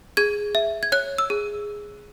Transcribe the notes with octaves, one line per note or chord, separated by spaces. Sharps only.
G#4 G#6
E5
G#6
C#5 F#6
E6
G#4